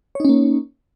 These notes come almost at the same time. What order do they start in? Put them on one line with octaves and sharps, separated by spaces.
C#5 D#4 C#4 A#3